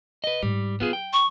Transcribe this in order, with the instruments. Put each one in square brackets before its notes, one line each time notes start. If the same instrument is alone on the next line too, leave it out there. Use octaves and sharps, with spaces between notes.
[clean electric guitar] B4 D#5
[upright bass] G#2 [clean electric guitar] G3
[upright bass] F#3 [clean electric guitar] B3 F4 G#4
[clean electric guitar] G5
[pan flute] C#6